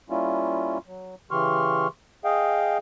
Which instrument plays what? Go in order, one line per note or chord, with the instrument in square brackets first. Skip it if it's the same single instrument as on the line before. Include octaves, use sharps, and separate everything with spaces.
[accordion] G3 A#3 C#4 E4 F4
F#3
C#3 E3 G4 C6 C#6 F6
G#4 D#5 F5 G5